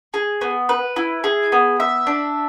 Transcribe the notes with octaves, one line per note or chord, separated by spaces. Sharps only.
G#4
B3
B4
E4
G#4
B3
E5
D4